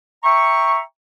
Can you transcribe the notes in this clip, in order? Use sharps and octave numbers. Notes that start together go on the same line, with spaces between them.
E5 G5 A#5 C#6